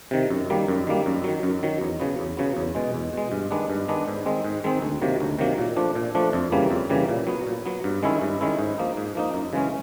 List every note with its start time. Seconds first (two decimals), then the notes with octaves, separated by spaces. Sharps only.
0.11 C3 D#3
0.30 F#2
0.50 D#3 G3 A#3
0.68 F#2
0.87 D#3 G3 A#3
1.06 F#2
1.24 D#3 F#3
1.43 F#2
1.63 D#3 F#3
1.81 E2
2.00 C#3 F#3 B3
2.19 E2
2.37 C#3 F#3 B3
2.57 E2
2.75 B2 G#3
2.94 E2
3.13 B2 G#3
3.32 G2
3.51 D#3 G#3 B3 D4
3.70 G2
3.88 D#3 G#3 B3 D4
4.08 G#2
4.26 D#3 G#3 C4
4.44 G#2
4.64 D#3 G#3 C4
4.82 D2
5.02 C3 D#3 F#3 A#3
5.20 D2
5.39 C3 D#3 F#3 A#3
5.58 A#2
5.76 F3 A3 D4
5.95 A#2
6.15 F3 A3 D4
6.33 F2
6.52 C#3 E3 G3 A#3
6.71 F2
6.90 C#3 E3 G3 A#3
7.09 A#2
7.27 F#3 B3
7.47 A#2
7.66 F#3 B3
7.84 G2
8.03 D#3 G#3 C#4 E4
8.21 G2
8.41 D#3 G#3 C#4 E4
8.59 G#2
8.78 F3 A#3 D#4
8.97 G#2
9.15 F3 A#3 D#4
9.34 F#2
9.53 C#3 E3 G#3 C#4